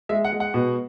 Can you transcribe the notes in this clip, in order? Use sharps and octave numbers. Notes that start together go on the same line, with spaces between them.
G#3 E5
F#5
G#3
F#5
B2